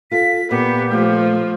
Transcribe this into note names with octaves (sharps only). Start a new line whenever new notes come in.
F4 A4 B6
A#2 B3 G4
F3 A3